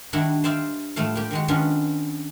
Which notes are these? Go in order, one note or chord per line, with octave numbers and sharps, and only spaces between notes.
D#3 G3 D4 E4 F#4
C5 D5 E5 F5
A2 F3 G3 A3 F5
A#3 G4
D#3 G#3 F#4
D#3 B3 C#4 D4 F4 B4